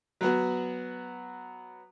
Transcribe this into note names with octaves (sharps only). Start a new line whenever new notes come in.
F#3 B3 F#4